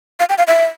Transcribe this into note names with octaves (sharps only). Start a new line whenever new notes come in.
F5
G5
F5
E5